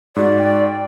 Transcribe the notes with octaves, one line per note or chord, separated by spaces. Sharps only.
G#2 F#4 D5
G5